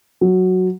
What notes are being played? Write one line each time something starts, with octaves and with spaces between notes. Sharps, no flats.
F#3